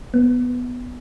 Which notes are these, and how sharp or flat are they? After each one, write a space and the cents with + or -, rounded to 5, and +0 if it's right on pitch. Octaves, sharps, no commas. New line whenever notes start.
B3 +0